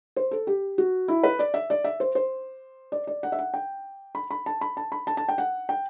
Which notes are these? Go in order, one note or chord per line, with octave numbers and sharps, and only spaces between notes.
C5
A4
G4
F#4
E4
B4
D5
E5
D5
E5
C5
C5
D5
D5
F#5
E5
F#5
G5
B5
B5
A5
B5
A5
B5
A5
A5
G5
F#5
G5